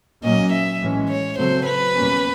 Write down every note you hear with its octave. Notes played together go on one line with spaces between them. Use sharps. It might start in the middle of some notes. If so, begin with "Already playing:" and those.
A#2 F#3 A#3 C#4 D#5
E5
A2 E3 G#3 C#4
C#5
C#3 F#3 A3 C4 C5
B4
E2 B2 G3 A#3 C#4